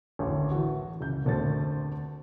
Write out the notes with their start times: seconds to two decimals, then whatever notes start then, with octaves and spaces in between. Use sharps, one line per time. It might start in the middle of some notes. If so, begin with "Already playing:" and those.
0.19 A1 D2
0.51 E3 F#4
1.01 C#2 G6
1.25 F1 D2 A3 C5 A6